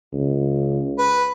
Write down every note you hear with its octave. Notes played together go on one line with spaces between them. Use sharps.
C#2
B4